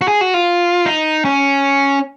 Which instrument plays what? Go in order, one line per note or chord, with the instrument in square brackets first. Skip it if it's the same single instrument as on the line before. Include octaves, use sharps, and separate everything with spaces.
[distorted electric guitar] F#4
G#4
F#4
F4
D#4
C#4